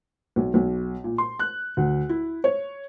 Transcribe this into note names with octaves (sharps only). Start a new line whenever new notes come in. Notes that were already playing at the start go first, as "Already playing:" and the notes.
B1
B1
A#2
C6
F#6
D2
E4
C#5